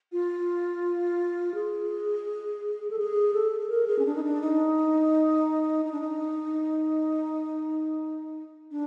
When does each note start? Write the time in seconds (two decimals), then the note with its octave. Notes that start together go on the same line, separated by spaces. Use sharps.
0.12 F4
1.54 G#4
2.91 A4
2.99 G#4
3.34 A4
3.60 A4
3.69 A#4
3.87 G#4
3.99 C#4
4.06 D4
4.15 D#4
4.23 D4
4.41 D#4
5.85 D#4
5.92 D4
6.01 D#4
8.71 D4